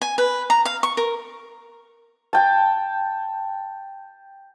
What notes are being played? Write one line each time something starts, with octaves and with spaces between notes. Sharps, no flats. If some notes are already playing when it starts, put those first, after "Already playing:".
G#5
B4
A#5
F5
C#6
A#4
G5 A5